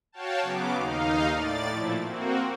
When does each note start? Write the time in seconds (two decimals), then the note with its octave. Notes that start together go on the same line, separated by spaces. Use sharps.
0.12 F#4 C#5 F5 G5 A5
0.42 C#3 F#3 B3 D6
0.77 D#2 D#4 F5
1.33 A2 D5 A6
1.71 A#2 F3 A3 E4
2.03 A#3 C4 F#4